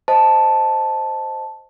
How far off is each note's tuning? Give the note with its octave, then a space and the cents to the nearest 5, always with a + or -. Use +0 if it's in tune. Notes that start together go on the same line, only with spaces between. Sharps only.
C5 +0 D#5 +0 A5 +0